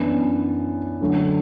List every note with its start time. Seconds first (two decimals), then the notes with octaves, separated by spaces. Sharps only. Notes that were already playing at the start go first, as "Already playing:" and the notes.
Already playing: F#2 E3 B3 D4
1.01 D3 F#3 A3